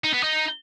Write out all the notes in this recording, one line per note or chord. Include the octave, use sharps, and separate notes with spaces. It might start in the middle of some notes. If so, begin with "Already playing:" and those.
D#4
B3
D#4